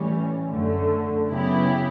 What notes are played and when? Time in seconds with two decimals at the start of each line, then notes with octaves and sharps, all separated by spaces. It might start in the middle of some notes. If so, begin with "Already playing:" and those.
Already playing: A2 E3 G3 C#4
0.47 F#2 D3 A3
1.29 C#3 F#3 B3 E4 G4